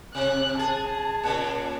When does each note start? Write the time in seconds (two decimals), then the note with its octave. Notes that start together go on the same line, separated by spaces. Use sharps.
0.15 C3 F#6
0.59 G#4 A5
1.23 A#2 C#3